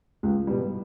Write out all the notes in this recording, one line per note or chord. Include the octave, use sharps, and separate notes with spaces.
C#2
B2 G3